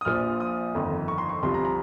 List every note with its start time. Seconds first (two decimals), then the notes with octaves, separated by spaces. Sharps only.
0.01 D#6
0.05 A#1 A#2 F3 F6
0.40 D#6
0.74 G1 F2 D#3
1.08 C#6
1.18 C6
1.29 C#6
1.43 C2 C3 F3 C6
1.54 A#5
1.65 A#5